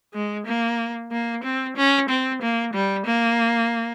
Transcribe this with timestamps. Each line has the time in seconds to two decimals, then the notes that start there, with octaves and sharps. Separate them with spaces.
0.14 G#3
0.46 A#3
1.11 A#3
1.44 C4
1.76 C#4
2.09 C4
2.41 A#3
2.73 G3
3.06 A#3